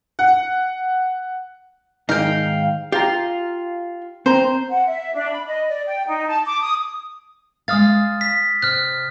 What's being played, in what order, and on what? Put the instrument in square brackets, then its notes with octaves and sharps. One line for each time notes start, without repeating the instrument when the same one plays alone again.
[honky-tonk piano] F#5
[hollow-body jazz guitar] G#2 D#3 D#4 [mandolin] F5 G5
[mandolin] F4 [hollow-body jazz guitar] G4 A#5
[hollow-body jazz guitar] C4 A#5 [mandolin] C5
[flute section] F#5
E5
D4
B5
D#5
D5
G5
D#4
A5
D6
D#6
[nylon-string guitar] G#3 F5 [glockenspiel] D#6 F6 A6
[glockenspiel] B6
[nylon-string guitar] C3 [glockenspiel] F6 F#6